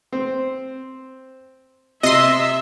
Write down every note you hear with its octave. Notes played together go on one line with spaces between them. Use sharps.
C4
C3 D#5 E5 C6